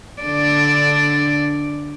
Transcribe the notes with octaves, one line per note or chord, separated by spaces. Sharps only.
D3 D4 D5